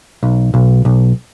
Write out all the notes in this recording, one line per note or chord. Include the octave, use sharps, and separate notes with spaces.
B1
B1
B1